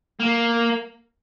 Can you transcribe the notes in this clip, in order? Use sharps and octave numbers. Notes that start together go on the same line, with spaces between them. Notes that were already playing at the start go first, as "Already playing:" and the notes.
A#3